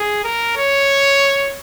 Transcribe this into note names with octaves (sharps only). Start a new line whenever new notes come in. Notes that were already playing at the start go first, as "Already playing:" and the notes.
Already playing: G#4
A#4
C#5